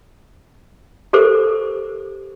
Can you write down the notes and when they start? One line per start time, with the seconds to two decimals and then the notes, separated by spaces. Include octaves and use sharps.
1.13 G4 A4 A#4 C5 D6